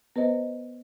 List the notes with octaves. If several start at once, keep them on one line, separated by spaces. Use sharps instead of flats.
B3 B4 C5 D#5